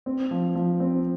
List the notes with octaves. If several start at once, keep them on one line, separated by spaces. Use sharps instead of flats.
C4
F3
F3
C4